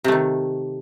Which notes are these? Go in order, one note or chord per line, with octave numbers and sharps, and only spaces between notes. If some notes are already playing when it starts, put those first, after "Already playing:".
C3 D#3 A3